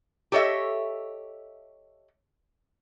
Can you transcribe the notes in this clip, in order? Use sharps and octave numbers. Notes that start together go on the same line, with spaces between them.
G4 A4 C#5 D#5 E5